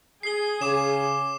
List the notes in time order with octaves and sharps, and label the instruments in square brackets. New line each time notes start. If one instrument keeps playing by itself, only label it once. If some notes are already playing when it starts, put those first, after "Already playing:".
[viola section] G#4 [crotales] C7 G7
[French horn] C#3 [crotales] D6 E7